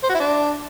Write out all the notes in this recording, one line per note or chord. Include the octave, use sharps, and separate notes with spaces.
C5
F#4
E4
D4